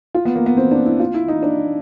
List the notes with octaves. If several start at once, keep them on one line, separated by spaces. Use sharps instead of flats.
F4
B3
A#3
B3
C4
D4
E4
F4
E4
D#4
D4